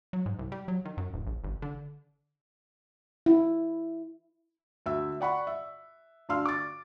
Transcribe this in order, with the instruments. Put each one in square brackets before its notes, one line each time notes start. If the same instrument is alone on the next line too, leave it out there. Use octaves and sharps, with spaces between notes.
[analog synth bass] F#3
G#2
C2
G3
F#3
D#3
F#2
D1
A#1
G1
D3
[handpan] E4
[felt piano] D2 E5 E6
D5 F#5 B5 C#6
E5
D2 D4 F5 C6 E6 F6
D6 A6